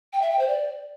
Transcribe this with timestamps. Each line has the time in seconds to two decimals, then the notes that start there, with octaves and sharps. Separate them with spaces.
0.13 G5
0.22 E5
0.30 G5
0.39 C5
0.48 D5